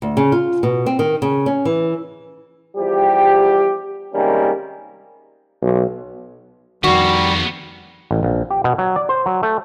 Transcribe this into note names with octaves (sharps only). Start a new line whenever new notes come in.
D2
C#3
F4
B2
C4
D#3
C#3
C#4
E3
E2 F3 G3 G4
C3 D#3 G3 G#3 A#3 C#4
B1
F2 D#3 G3 A#3 B3 F#4
A1
A#1
G4
B2
F#3
D5
C5
F#3
A3